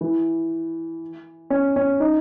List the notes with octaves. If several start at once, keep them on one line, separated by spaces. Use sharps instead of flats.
E3
C#4
C#4
D#4